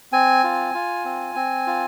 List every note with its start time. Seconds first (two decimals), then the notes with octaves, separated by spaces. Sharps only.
0.12 C4 G#5
0.44 F4
0.74 F4
1.05 C4
1.35 C4
1.67 F4